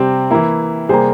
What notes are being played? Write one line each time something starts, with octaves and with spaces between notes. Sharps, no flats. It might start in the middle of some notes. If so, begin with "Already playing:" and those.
Already playing: C3 G3 C4
E3 A#3 E4
C3 G3 A#3 G#4 C5